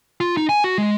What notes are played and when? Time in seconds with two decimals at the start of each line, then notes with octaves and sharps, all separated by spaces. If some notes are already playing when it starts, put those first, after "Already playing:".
0.20 F4
0.37 D#4
0.49 G#5
0.64 F#4
0.78 G#3